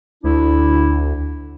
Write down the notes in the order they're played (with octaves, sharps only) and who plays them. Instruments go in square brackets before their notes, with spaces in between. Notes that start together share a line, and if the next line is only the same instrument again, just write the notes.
[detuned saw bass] D2 [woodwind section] D4 E4